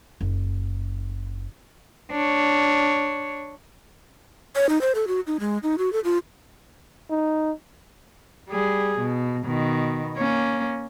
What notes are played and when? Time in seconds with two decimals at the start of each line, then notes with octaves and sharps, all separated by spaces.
0.20 F#1
2.11 D4 C#5
4.56 C#5
4.69 D#4
4.81 C5
4.95 A4
5.08 F#4
5.27 D#4
5.40 G#3
5.63 D#4
5.78 F#4
5.93 A4
6.04 F4
7.10 D#4
8.49 G3 G#4
8.99 B2
9.46 B2 D#3
10.17 A#3 C#4